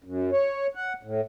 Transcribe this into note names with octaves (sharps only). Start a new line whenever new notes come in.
F#2
C#5
F#5
A2